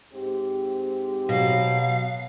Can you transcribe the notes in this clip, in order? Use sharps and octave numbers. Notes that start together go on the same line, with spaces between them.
G#2 C4 G4
B2 F#3 F5